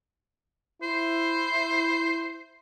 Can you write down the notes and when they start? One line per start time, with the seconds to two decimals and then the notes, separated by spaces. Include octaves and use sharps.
0.83 E4 C5